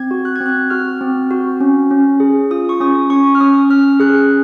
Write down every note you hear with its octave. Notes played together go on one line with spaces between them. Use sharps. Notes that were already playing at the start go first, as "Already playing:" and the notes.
Already playing: C4 G#6
F#4
F#6
C4 G#6
F#6
F#4 F6
C4
F#4
C#4
C#4
G#4
F4 D#6
C#6
C#4 D#6
C#4 C#6
F6
C#4 D#6
C#4 F6
G#4 F#6